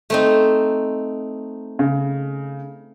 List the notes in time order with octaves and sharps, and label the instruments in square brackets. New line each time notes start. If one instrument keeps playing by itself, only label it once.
[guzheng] A3 C4 D#4
[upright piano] C#3